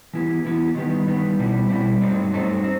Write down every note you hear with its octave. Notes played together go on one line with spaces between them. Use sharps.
E3 B3 E4 G4
E3 B3 E4 G4
D#3 G3 B3
D#3 G3 B3
B2 G3 C4 E4
B2 G3 C4 E4
G2 F#3 A3 C4 D#4
G2 F#3 A3 C4 D#4
C4